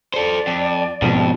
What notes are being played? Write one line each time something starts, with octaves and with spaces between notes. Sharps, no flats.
A4 C5 D5
F2
F2 G#2 B2 F3